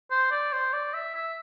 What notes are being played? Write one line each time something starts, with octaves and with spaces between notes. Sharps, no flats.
C5
D5
C5
D5
E5
E5